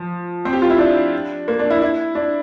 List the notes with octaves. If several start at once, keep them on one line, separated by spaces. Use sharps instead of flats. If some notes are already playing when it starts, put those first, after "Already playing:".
Already playing: F3
C4
G4
F4
E4
D4
A#3
D4
E4
E4
D4